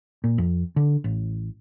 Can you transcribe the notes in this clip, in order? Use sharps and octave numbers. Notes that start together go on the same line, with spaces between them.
A#2
F2
D3
A1